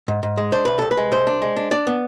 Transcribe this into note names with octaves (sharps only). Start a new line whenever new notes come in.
G#2
G#2
G#3
D4 C5
C2 B4
C2 A4
B4
G#3
C2 C5
D4
G#3
D4
D4 D5
B3